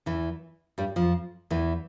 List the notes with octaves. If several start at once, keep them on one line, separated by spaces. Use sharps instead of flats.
E2 E3
G2 G3
F2 F3
E2 E3